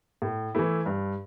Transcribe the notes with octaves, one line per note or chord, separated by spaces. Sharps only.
A2
E3 A3 E4
G2